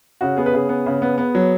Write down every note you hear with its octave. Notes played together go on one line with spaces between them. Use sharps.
C#3 F#4
B3 G#4
B4
C#3 G#4
B3
C#3
B3
B3
F#3